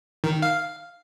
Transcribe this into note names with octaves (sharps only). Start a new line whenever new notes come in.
D#3
F5